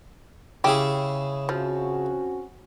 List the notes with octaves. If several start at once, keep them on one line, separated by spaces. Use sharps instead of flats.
C#3 E4 G4 G#4
F3 C4 C#4 F#4